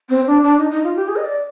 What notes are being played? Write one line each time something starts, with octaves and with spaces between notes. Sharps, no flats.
C4
D4
D4
D#4
D#4
F4
G4
G#4
D#5
D5